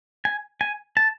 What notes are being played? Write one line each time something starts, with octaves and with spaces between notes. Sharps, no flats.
G#5
G#5
A5